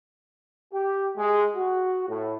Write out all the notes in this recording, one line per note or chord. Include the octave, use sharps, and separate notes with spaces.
G4
G#3
F#4
A2